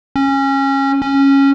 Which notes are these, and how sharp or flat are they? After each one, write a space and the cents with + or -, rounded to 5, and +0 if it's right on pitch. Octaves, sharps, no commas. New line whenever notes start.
C#4 -20
C#4 -10